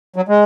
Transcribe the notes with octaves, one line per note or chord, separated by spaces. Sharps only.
F#3
G#3